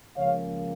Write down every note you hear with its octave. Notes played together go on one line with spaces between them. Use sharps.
C#2 C#3 F3 A#3 C#4 C#5 F5